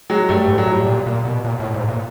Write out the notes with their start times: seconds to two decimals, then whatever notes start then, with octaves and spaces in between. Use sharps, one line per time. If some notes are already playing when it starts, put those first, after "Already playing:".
0.10 F#3 G#3
0.29 G2 G3 A3
0.43 G3
0.48 G#2
0.58 F#3
0.67 A2
0.73 G3
0.86 A#2
1.06 A#2
1.25 B2
1.44 A#2
1.60 A2
1.74 G#2
1.88 A#2